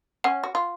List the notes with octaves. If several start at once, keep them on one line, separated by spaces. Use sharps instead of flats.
C#4 F#5
F#4
F4